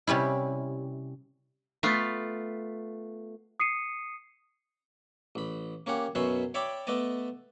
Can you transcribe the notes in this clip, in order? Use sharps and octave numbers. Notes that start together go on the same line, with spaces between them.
C3 G3 C#4 E4
A3 B3 F4
D#6 C7 C#7 D#7
A1 B5
A#3 C#4 G4 F#5
F#2 B2 C#4 E5 B5 C6
C#5 D5 E5 G5 B5 D6
A3 B3 D5 D#5 A5